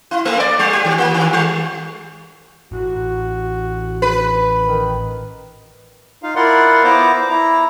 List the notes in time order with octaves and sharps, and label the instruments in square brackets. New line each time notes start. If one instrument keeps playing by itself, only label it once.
[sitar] E4
A3
D5
G3
G4
D#3
A#3
D#3
G3
[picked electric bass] A1 [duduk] F#4
[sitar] B4
[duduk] D#3
[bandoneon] D#4 F4 F5
E4 F4 A#4 D5 F#5 C6
B3 E4 C5 A#5 D6
E4 A#5